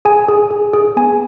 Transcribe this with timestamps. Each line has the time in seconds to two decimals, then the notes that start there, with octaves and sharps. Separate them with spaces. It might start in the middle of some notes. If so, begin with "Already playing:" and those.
0.05 G#4 G#5
0.28 G#4
0.51 G#4
0.73 G#4
0.97 B3 G#5